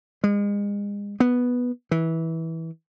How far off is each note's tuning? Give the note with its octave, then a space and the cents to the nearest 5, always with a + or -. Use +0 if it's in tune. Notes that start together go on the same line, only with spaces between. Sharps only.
G#3 -35
B3 -5
E3 -20